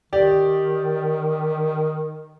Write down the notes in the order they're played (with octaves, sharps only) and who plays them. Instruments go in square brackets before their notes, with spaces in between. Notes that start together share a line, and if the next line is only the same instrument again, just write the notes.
[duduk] D#3 [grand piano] G4 D5